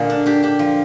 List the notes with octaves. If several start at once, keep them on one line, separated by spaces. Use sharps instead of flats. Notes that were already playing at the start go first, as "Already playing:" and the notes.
Already playing: A#2 D3 A#3 G#4 A#4
D4
D4 G4
D4 G4
F3